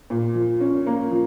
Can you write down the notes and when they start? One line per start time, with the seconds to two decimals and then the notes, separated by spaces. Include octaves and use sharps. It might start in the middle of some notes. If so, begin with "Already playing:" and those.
0.10 A#2
0.35 F3
0.61 C#4
0.87 A#3
1.11 F3